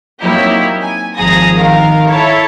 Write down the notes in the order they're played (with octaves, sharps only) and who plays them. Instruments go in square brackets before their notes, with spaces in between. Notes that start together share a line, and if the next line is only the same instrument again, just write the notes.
[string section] F#3 A#3 C4 D#4 E4 G4
G#5
G#1 F3 G#4 A#5 D#6 A#6
D#3 A#4 F5
E4 A4 C#5